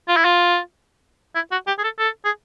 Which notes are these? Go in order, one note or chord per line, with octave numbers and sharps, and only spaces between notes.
F4
E4
F4
E4
F#4
G4
G#4
A4
A4
G#4